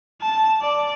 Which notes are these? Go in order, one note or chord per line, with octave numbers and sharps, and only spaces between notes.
A5
D5